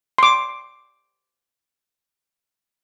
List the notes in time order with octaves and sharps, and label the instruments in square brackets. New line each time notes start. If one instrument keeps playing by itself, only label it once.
[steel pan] C6 D6